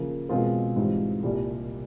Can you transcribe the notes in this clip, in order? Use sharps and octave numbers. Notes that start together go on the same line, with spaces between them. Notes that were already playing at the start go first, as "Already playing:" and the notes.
Already playing: C#3 F3 A#3
B2 G#3 C4 F4 A#4
G#2 E3 G3 C4 F4
C2 A#2 G3